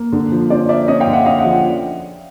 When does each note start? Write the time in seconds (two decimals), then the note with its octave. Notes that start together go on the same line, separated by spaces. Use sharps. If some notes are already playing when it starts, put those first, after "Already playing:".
Already playing: A#3
0.12 D3
0.32 F3
0.50 C#4 C5 D5
0.69 A#3 D5 E5
0.88 C#4 C#5 D#5
1.00 F5 G5
1.07 D3
1.13 E5 F#5
1.26 C#4 D#5 F5
1.39 E5 F#5
1.44 F3
1.51 E5 F#5